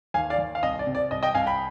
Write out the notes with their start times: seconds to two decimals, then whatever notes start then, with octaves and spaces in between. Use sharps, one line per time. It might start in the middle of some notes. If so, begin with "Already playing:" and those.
0.14 D#2 F5 G#5
0.30 D5 F5
0.38 D#2
0.55 F5
0.63 C2 D#5
0.79 D5
0.87 C3
0.95 D5
1.11 C2 D#5
1.23 D#5 G5
1.35 C2 F5 G#5
1.46 G5 B5